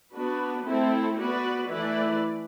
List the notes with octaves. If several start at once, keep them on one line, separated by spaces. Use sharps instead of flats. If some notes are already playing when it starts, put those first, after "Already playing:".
B3 D4 F#4 B4
A3 C4 E4 A4 C5
B3 F#4 B4 D5
E3 A3 E4 B4 D5